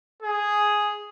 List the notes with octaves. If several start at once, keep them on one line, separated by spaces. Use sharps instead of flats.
G#4